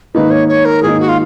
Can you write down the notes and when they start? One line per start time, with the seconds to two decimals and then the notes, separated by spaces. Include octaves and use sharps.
0.15 G#2 D#3 A#3 D#4 B4
0.31 C#5
0.48 C#5
0.65 A#4
0.83 G#2 D#3 A#3 D#4 G#4
1.00 F#4
1.09 F4